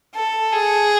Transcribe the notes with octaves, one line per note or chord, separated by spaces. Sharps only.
A4
G#4